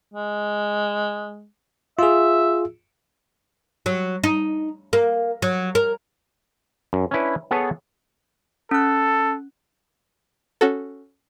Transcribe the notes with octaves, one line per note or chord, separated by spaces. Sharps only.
G#3
F4 G#4 E5
F#3
D#4
A#3
F#3
A#4
F#2
C#4 D4 E4 B4
B3 G#4 A4 B4 C#5 A5
C#4 A4 F#6
C#4 F#4 A4